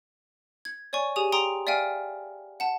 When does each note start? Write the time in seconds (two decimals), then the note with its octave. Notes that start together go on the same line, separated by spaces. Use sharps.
0.65 G#6
0.93 C#5 D5 G#5 C#6
1.16 G4 G#4 G#5 D#6 D#7
1.32 G5 A#5 C6 D#6
1.67 D5 E5 F5 G5 G#5 F6
2.60 F#5 A5